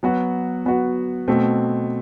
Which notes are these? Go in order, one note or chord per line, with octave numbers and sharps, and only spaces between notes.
F#3 B3 F#4
F#3 B3 F#4
B2 A3 C4